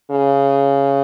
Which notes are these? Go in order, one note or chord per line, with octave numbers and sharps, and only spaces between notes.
C#3